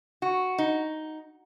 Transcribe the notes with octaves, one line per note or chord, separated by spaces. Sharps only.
F#4
D#4